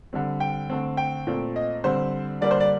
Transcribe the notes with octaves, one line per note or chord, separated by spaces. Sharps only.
D3 G3 C4
G5
D3 A3 C4
G5
A#2 A3 C4
D#5
D3 G3 C4 C5
D3 G3 A#3 D4 D5
C5
D5